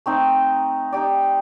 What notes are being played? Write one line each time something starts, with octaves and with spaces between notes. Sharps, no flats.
A3 C4 D#4
D#4 G4 D5